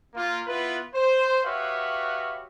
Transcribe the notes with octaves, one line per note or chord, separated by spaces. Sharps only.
A#3 F4
B3 E4 F4 B4
C5
F#4 G4 B4 C#5 E5 F5